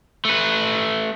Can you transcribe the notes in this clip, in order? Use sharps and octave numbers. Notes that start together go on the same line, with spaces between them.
A3 B4